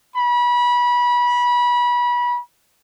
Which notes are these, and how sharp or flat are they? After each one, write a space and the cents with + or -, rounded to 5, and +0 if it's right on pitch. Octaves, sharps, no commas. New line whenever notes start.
B5 -25